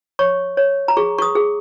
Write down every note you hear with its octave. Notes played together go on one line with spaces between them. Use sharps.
C#5 C#6
C#5
A#5
G#4 C#6
C#6
D#6
G#4